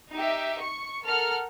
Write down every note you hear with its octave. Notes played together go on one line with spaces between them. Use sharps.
D#4 G4 E5
C#6 C#7
A4 A#4 F#5 F6